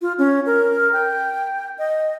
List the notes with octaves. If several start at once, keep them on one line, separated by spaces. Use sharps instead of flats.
F4
C#4
A#4
G5
D#5